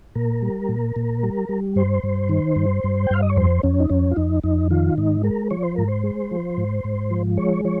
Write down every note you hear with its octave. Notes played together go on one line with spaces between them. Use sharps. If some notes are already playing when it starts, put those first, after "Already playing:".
A#2 A#4
G3
A#2
A#2
G3
G3
G2 C5
G2
D#3
G2
G2
G5
G2 F5
D#5
C#5
F2 C5
F2 C#4
D#4
F2 C#4
F4
F2 D#4
F2 D#4
D#3 F4
G#2 D#4
G#3 A#4
F3 C#5
C5
G#2 A#4
C5
G#3
F3
G#2
G#2
F3
G#3 C#5
F3 C#5